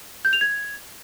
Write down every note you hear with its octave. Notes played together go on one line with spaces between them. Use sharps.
G6
F7
G#6